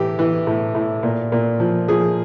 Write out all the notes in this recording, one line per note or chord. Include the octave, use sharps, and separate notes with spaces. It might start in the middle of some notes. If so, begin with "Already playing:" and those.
Already playing: A2 E3 G4
E3
A2
A2
A#2
A#2
F3
F3 G#4